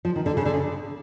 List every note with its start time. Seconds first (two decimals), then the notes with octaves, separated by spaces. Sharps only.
0.05 F3
0.16 D#3
0.26 D3
0.37 C#3
0.46 D3
0.54 C#3